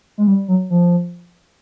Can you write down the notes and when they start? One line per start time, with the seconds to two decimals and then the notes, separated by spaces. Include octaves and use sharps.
0.18 G#3
0.27 G3
0.48 F#3
0.70 F3